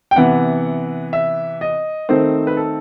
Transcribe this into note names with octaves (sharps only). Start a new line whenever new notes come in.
G5
C3 E3 B3 F#5
E5
D#5
D#3 A3 C4 D#4 C5
B4
A4